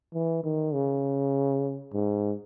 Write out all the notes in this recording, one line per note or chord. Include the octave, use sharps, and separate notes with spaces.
E3
D#3
C#3
G#2